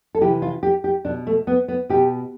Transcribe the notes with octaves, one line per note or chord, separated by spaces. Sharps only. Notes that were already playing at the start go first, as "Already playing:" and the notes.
A4
C3 E3 G4
F4
G4
G4
B2 D4
A3
B3
B3
B2 G4